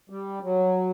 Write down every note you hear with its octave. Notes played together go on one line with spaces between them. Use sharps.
G3
F#3